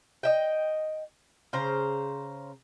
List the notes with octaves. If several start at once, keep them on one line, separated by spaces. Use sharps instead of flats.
D#5 E5 G5
C#3 C5 A#5